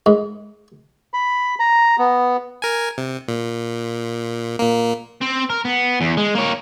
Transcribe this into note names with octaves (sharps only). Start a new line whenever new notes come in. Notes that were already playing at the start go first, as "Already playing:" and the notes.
G#2
B5
A#5
B3
A#4 G#5
C3
A#2
A#2 A#3
C4
A#4
B3
E2
G#3
A#3 C#5